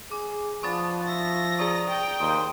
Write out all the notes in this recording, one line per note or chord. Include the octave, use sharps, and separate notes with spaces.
G#4 D6
F3 B3 D4 B4 C#6 D#6 A6
E5 A#6
G#4 D5 A#5 C#6 D#6
G5
D#2 C5 D#6